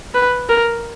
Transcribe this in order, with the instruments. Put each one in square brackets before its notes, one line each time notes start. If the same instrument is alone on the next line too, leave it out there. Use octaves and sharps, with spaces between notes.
[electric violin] B4
A#4